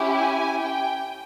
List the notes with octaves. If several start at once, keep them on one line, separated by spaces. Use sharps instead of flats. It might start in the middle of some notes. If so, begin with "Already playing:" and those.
Already playing: C#4 E4 G4
G#5
G5